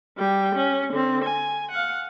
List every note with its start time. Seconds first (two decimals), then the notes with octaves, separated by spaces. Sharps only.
0.17 G3 G5
0.55 C#4
0.93 D3 C4
1.24 G#5
1.71 F5 F#5